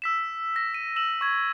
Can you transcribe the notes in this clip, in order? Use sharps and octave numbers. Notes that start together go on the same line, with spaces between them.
E6 B6 E7
A#6
D#7
E6 E7 F#7
C#6 G#6